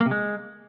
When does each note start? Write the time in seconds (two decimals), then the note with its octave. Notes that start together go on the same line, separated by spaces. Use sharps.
0.01 A#3
0.06 C3
0.11 G#3